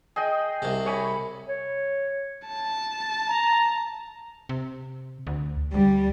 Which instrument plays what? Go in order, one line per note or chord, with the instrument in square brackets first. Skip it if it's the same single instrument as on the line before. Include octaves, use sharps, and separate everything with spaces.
[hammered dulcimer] G#4 D#5 G5
[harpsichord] C2 C3
[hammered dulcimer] C#5 G#5 B5
[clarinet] C#5
[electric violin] A5
[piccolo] A#5
[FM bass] C3
D2
[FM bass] D2 [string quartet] G3